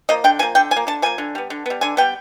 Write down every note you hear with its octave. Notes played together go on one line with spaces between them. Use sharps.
F3 A#3 D#5
D3 G5
F3 A#3 G#5
D3 G5
F3 G#5
A#3
D3 A5
F3 A#3 G#5
D3
G3 B3
D3
G3 B3
D3 G#5
G3 B3 G5